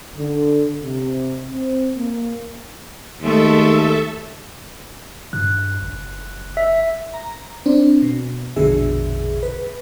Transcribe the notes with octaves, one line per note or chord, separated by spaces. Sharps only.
D3
C3
C4
A#3
D#2 G#3 A3 A4 E5
G2 F#6
F#1
E5
A#5
C4 D4
B2
A#1 F2 B2 D3 G#4 E5
B4